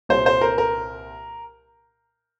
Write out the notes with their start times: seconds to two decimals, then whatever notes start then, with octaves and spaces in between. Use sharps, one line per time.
0.09 C2 A#2 C5
0.26 C5
0.41 A#4
0.58 A#4